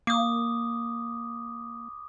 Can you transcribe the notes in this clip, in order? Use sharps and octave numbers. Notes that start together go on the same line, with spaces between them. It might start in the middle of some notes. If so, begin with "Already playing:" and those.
A#3 D6 D#6